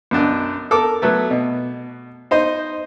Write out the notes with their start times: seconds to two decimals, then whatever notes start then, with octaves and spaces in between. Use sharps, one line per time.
0.11 B1 F#2 D4 D#5
0.71 A4 A#4 D6
1.02 F#3 A3 B3
1.30 B2
2.31 D#4 C5 D#5